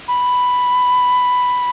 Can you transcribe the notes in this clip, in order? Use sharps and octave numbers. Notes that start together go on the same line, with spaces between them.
B5